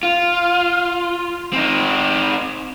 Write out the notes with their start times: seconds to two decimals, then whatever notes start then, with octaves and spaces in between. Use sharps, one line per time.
0.03 F4
1.53 C4 D#4